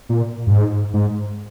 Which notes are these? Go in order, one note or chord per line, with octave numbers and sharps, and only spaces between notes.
A#2
G2
G#2
G#2